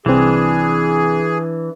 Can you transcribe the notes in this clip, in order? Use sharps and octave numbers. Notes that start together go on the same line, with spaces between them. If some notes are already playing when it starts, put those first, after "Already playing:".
C2 E3 C4 D4 G#4